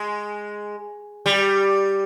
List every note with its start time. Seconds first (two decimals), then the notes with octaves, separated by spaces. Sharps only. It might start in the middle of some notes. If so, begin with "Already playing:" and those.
Already playing: G#3
1.26 G3